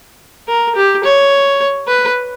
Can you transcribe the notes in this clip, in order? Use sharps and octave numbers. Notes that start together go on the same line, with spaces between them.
A#4
G4
C#5
B4